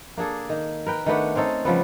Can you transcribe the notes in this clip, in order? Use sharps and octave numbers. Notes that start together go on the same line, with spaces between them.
A#3 D4 G#4 A4
D#3
A#4 B4 G5
D#3 A3 B3 D4
C4 C#4 D#4 A4
C#3 F3 G3 B3